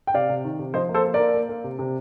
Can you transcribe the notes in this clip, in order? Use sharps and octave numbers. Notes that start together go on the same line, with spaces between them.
G5
C3 D5 F5
C3
D#3
C3
F3 C5 D#5
A#3
A4 C5
A#3
A#4 D5
A#3
A#3
A#3
C3
C3